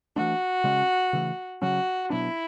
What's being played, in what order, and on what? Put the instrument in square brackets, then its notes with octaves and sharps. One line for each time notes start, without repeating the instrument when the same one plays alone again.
[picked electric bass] E3 A3 D4 [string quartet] F#4
[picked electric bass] C#3 G#3 C#4
C#3 E3 A3
[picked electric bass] C#3 F#3 C#4 [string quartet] F#4
[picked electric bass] B2 F#3 B3 D4 [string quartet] E4